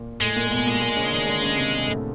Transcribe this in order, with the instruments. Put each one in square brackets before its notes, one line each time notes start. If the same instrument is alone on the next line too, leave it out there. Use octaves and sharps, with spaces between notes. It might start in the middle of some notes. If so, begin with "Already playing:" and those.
Already playing: [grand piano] A#2 A#3
[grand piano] A2 A3 [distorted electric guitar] G#3
[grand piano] A#2 A#3
A#3
B2 B3
A#2 A#3
A#2 A#3
C#3 C#4
D4
D#3 D#4
D3 D4
C#3 C#4
C3 C4
B2 B3
A2 A3